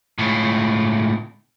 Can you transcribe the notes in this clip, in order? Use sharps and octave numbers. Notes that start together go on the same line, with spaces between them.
C#2 A2